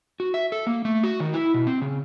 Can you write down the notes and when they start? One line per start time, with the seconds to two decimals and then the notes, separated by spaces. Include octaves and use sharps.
0.20 F#4
0.34 E5
0.52 A4
0.67 A#3
0.85 A3
1.03 F#4
1.20 D#3
1.34 E4
1.54 B2
1.67 C4
1.82 C#3